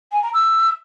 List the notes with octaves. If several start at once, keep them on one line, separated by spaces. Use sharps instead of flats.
G#5
A#5
E6